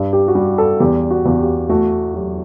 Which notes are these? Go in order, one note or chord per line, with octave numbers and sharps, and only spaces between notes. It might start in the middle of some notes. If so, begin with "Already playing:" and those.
Already playing: G2
G4
F#4
G3 G4
A4
E2 G4
F#4
E2
G4
A3 F#4
F#3 G4